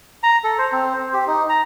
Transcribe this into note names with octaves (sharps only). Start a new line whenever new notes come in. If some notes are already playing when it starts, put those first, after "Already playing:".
A#5
A4
C5
C4
C5
G4
D#4
A#5